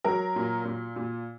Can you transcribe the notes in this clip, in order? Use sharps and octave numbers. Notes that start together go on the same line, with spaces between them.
F#3 A#4
A#2
A#2
A#2